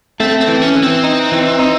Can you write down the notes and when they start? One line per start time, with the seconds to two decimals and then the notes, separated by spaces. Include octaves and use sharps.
0.20 A3 C4
0.41 C4
0.48 E3
0.62 C#4
0.76 E3
0.83 C4
1.04 D#4
1.32 E3
1.59 D#4